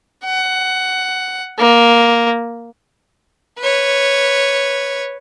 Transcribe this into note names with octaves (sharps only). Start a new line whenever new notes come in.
F#5
A#3
B4 C#5